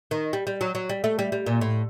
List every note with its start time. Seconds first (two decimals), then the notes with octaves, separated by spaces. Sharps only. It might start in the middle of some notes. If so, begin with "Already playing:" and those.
0.11 D#3
0.33 G3
0.47 G3
0.61 F#3
0.75 F#3
0.89 G3
1.04 A3
1.19 G3
1.32 G3
1.46 A#2
1.61 A2